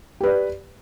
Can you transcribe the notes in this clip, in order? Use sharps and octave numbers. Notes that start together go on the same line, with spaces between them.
G4 B4 D5